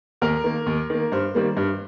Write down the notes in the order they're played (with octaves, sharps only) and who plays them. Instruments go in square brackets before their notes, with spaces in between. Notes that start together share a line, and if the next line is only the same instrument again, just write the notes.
[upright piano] D#2 A#4
D#3 A#3
D#2
D#3 A#3
G2 C5
D#3 G3 A#3
G2